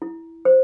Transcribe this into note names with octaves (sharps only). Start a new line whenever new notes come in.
E4
C5